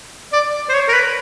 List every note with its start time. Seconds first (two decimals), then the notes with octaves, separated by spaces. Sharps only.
0.33 D5
0.69 C5
0.73 C#5
0.88 A#4
0.94 B4